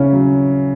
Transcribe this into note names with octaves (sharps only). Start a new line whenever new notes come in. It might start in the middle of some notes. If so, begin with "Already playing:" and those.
Already playing: C#3 C#4 E4
F#3